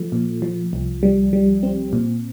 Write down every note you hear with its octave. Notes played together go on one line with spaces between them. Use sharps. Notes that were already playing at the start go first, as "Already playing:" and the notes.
Already playing: F3 A3
A#2
F3
C2
G3
G3
C4
A#2